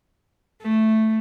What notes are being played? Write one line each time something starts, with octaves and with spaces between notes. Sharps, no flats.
A3